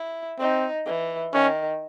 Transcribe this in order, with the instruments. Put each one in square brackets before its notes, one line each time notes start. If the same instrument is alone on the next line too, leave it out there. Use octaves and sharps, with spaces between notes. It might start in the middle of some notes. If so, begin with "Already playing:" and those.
Already playing: [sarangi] E4
[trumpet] C4 [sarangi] D#4
[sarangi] E3
[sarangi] D#3 [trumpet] C#4